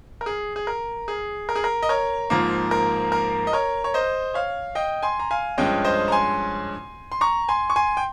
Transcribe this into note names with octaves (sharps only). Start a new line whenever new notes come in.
A#4
G#4
G#4
A#4
G#4
A#4
G#4
A#4
D#5
A#4 C#5
G#2 F3 A#3
A#4
A#4
D#5
A#4 C#5
C#5
C5 D#5
C#5 F5
D#5 G5
G#5 C6
A#5
F5 G#5
G2 F3 G#3 C#4 D#5 G5
C5 D#5
A#5
G#5 C6
C6
A#5 C#6
G#5 C6
C#6
G#5 C6
G5